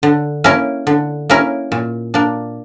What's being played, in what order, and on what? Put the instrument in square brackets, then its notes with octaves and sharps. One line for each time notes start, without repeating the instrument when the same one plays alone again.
[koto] D3
A#3 C#4 E4 A#4
D3
A#3 C#4 E4 A#4
A#2
A#3 D4